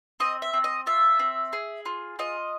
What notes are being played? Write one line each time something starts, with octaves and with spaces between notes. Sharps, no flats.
C4 D#5
E5
C4
D#5
F4 E5
C4
G#4
F4
F4 D#5